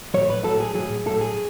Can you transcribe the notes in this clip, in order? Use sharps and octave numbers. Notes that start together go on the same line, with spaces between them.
A2 F#3 C#5
B4
A2 F#3 A4
G#4
A2 F#3 G#4
A2 F#3 A4
G#4